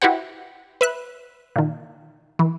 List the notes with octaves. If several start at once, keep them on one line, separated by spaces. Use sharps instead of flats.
E4 F#4 G4 B4 C5 F#5
B4 E5 F#6
A#2 D#3
E3